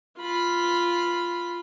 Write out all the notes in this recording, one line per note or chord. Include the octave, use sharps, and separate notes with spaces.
F4 B5